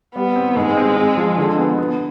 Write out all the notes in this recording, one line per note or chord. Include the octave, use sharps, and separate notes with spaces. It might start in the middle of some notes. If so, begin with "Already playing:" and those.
G3 B3
C4
G#2 G#3
C4
C4
F3
D3
B3
B3